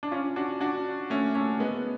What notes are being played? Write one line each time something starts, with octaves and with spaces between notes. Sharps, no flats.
D4
C#4 F4
D4 F#4
D4 F#4
A3 C#4
A3 C#4
G#3 B3